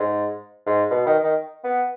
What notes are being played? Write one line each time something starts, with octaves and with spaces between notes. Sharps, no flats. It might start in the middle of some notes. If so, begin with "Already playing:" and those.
Already playing: G#2
G#2
B2
D#3
D#3
B3